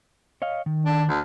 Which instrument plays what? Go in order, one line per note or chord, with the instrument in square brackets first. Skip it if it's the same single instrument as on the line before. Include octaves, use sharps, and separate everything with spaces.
[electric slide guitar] C#5 D#5 F5
D#3
[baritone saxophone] D4
D2